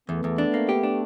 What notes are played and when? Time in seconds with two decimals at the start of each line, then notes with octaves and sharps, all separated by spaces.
0.09 E2 A3 B3
0.24 E2
0.38 D4
0.54 A#3
0.69 G4
0.83 D4